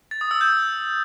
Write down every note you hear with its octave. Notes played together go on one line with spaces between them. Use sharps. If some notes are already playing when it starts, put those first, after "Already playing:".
A6
D#6
E6
G6